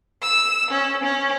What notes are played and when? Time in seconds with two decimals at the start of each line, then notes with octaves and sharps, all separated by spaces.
0.22 E6 E7
0.71 C#4
1.03 C#4